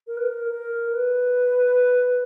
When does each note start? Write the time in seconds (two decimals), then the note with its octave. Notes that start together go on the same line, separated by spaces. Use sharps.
0.07 A#4
0.17 B4
0.26 A#4
0.49 A#4
0.91 B4